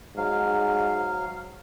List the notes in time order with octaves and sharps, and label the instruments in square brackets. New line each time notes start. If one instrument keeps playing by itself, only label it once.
[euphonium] G#2 [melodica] F#3 F5